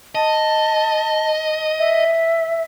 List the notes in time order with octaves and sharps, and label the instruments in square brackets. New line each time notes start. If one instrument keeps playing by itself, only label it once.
[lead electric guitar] D#5 [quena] A5
[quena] E5